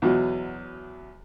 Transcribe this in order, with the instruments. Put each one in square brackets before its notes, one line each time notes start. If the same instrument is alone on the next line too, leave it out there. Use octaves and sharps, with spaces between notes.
[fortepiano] E2 B2 F#3